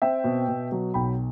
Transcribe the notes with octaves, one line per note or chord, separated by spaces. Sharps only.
C4 E5 G5
B2
B2
F#3
B1 G5 B5